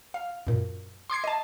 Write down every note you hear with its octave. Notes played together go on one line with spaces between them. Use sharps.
F5
F#2 A#2
C6 D6 G#6 C7
D#5 A5